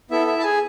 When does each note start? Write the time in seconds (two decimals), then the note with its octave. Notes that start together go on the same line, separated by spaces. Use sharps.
0.10 B3 E4 A4 E5
0.27 E4 E5
0.39 A5
0.44 G#4 G#5